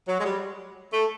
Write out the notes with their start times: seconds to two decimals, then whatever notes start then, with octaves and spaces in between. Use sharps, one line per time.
0.08 F#3
0.20 G#3
0.25 G3
0.93 A3